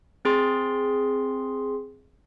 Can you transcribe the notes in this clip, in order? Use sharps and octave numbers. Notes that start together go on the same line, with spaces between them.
C4 G#4 C6